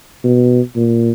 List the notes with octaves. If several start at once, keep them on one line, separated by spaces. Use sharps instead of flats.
B2
A#2